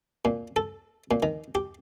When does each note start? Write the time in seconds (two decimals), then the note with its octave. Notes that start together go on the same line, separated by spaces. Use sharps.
0.25 A#2
0.56 A4
1.11 A#2
1.23 D#3
1.55 G4